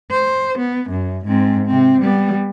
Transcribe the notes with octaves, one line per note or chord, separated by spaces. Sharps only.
C5
B3
F#2
G#2 C4
C3 C4
G3 B3